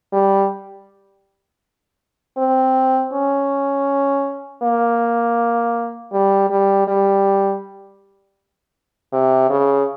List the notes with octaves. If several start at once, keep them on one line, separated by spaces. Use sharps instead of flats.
G3
C4
C#4
A#3
G3
G3
G3
C3
C#3